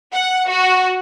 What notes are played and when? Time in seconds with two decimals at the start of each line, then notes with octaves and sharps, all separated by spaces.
0.12 F#5
0.47 F#4